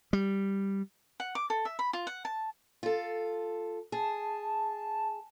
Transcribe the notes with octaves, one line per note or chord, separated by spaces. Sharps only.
G3
F#5
D6
A4
E5
B5
F4
F#5
A5
F4 A4
G#4 A5